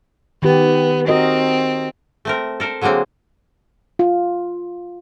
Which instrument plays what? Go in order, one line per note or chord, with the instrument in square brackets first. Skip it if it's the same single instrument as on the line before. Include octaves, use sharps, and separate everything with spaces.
[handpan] D#3 G4 [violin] B3
[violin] C4 [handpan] F#4 A#4 D#5
[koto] A3 C4 A#4
A4 A#4 C5
D3 F#3 G#3 A#3 C4
[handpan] F4